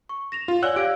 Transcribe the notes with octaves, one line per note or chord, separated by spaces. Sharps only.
C#6
A#6 E7 F7
F4
C#5 D5 F#5 G#5 E6 F#6
G4 F5 G#6 D7